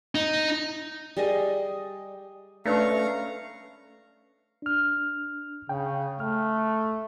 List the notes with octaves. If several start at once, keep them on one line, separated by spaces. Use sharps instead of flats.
D#4
G3 G#4 D#5
A3 C#4 D4 B4 F5 A#5 C#6
D4 F6
C#3 G5
A3 F6